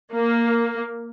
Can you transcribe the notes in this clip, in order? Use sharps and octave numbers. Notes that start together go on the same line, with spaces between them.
A#3